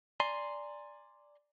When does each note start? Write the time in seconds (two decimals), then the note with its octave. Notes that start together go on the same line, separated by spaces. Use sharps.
0.20 D5 G#5 A#5 C6